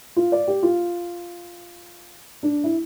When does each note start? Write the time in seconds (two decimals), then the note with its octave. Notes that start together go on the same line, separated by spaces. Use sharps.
0.16 F4
0.32 D5
0.48 G4
0.63 F4
2.43 D4
2.64 E4